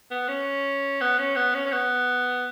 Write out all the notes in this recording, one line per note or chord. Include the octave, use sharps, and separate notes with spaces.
B3
C#4
B3
C#4
B3
C#4
C#4
B3